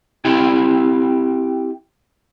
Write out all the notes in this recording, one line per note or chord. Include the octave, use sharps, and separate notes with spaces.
C4 E4 G4 E5 G5